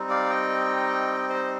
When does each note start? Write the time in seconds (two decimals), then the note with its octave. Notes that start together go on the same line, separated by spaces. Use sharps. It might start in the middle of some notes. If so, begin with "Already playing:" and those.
Already playing: G3 C4 D#4
0.10 D5 F5
0.30 D#5 G5
1.29 C5 D#5